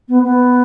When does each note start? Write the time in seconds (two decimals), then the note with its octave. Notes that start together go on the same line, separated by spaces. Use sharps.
0.09 B3
0.23 B3